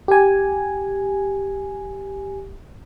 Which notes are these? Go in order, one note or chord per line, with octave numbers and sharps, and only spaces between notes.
G4 G#5